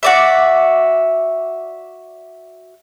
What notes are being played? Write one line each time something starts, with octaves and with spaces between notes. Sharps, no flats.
F#4 D5 E5